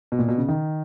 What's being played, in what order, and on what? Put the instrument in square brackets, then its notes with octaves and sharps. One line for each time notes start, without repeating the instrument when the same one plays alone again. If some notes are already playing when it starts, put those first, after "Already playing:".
[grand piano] B2
A#2
B2
C#3
D#3